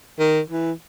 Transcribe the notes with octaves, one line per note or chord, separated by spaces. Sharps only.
D#3
E3